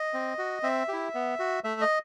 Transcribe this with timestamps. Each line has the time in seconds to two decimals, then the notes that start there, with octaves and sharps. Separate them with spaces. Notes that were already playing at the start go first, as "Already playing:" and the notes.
Already playing: D#5
0.14 C4
0.38 F#4
0.63 C4 E5
0.88 E4 G4
1.14 B3
1.39 F#4
1.64 A3 E5
1.81 D#5